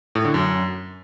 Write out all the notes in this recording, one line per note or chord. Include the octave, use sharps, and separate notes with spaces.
A2
D3
F#2